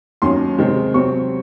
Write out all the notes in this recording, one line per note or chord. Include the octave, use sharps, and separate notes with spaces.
D#2 D#3 F#3 C#4 C6
C3 D#3 G#3 C4
C3 F#3 C4 C#6